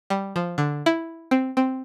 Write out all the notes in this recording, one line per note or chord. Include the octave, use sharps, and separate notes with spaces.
G3
F3
D3
E4
C4
C4